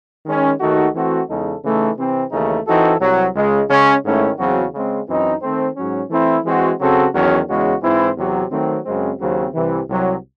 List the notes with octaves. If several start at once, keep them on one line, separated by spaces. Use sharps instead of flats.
D#3 G#3 C#4
D#2 D#3 A3 D#4 F#4
E3 A3 C4 F#4
E2 C#3 G#3 D#4 A4
C#3 E3 A3 D#4
C3 E3 C4
D#2 C#3 E3 A3 D#4
E3 C4 D#4 F#4 A4
C2 C3 F#3
C#2 C#3 G#3
C#3 G#3 C#4
G#2 D#3 A3 C#4 E4
E2 C#3 F#3 C4 F#4
C#3 G#3 C4
F#2 E3 C4 D#4
D#3 A3 C4
G#2 F#3 C#4
E3 A3 C4 E4
E3 G#3 C4 F#4
C#3 F#3 C4 F#4 A4
E2 D#3 F#3 C#4 F#4
E2 C#3 G#3 C#4 F#4
G#2 E3 C4 E4 C5
E2 C3 F#3
D#3 F#3 A3 C4
F#2 C#3 G#3 C4
D#2 C#3 F#3 C4
C2 C3 E3
C2 C3 F#3